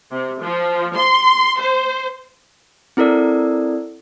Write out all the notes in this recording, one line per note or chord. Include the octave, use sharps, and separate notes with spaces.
C3
F3
C6
C5
C4 E4 A4 A#4 D5